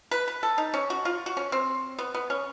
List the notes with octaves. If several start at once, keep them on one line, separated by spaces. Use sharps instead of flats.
B4
B4
A4
D#4
C#4
F#4
F4
F#4
C#4
C4
B3
B3
C#4